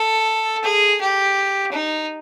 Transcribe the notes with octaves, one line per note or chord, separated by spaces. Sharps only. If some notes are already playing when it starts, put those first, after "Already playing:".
Already playing: A4
G#4
G4
D#4